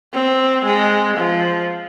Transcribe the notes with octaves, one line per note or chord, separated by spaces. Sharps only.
C4
G#3
F3